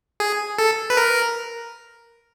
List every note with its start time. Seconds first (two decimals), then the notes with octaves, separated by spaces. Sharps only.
0.20 G#4
0.59 A4
0.90 B4
0.97 A#4